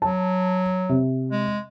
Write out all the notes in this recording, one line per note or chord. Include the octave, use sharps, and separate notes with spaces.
F#3 A5
C3
G#3